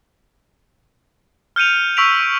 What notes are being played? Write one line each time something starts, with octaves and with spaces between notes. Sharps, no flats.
F6 G6 C#7 D#7 F7
C#6 E6 B6 D7 F7